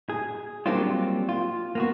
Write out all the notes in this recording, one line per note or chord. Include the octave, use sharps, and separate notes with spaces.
G#4
F#3 G3 A#3 C4 D4 F4
F4
A#3 B3 F#4